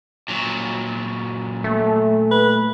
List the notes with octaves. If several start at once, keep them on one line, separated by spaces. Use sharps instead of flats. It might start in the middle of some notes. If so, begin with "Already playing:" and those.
A#2 F#3
A3
B4